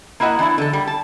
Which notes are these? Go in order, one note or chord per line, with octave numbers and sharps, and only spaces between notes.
A#3 E4 F#4 D#5 F#5
E3 D4 E4
D3 A4
G3
A5